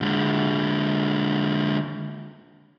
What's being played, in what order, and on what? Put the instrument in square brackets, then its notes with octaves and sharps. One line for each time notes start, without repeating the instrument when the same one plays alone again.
[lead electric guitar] D3 G#3